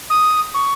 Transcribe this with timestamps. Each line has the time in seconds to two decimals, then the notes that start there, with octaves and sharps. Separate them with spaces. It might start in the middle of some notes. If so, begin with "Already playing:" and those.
0.10 D#6
0.54 C#6